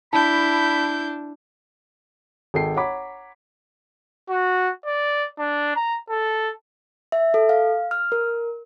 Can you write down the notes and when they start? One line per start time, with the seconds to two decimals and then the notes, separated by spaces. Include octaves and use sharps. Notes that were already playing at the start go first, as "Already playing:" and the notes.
0.13 D4 E4 A5 B5 G6
2.54 G#1 G#4 A4 G5 C7
2.76 C#5 F#5 A#5 B5 D6 B6
4.29 F#4
4.86 D5
5.39 D4
5.76 A#5
6.09 A4
7.12 E5
7.34 A4
7.49 F5
7.91 F6
8.12 A#4